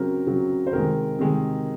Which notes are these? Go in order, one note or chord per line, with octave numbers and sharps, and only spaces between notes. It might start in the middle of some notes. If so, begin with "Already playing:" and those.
Already playing: C#3 F#3 C4 A#4
C#3 F#3 C4
C5
C3 D#3 G#3 A#4
C3 D#3 G#3